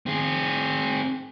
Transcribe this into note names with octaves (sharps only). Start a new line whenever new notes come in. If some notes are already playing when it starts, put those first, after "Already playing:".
C4 G#4